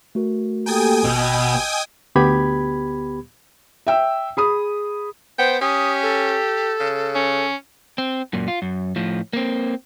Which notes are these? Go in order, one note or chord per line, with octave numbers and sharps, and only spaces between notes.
A3 F#4 A#4
A#3 G4 A4 G5 G#5 D#6
G#1 B2 B3 D#5 E6
D2 B3 G4 B5 G#6
E5 G5 E6
G#4 B5 D#6
B3 C5 G5
C#4 G4 D#6
A4
C#3
C#4
C4
F#2 A#2
F4
F#2
A2 F3
A#3 C4